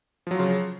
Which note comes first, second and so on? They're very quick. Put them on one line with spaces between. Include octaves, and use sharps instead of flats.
F3 F#3 F4 C#3